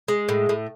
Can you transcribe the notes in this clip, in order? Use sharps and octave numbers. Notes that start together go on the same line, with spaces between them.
G#3
A2
A2